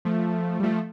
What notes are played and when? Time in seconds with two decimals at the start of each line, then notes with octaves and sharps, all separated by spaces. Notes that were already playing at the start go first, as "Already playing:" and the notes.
0.05 F3 A3
0.60 G3
0.63 F3 A3